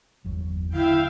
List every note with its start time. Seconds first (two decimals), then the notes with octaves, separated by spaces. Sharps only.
0.24 G1 E2 F#3
0.74 D3 E4 E5 F5 G5